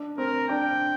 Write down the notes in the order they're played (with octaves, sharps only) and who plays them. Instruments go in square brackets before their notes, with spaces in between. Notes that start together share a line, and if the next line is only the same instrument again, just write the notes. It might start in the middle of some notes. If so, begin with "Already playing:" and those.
Already playing: [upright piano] D4
[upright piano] C4 [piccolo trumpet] A#4
[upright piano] D4 [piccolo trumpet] G5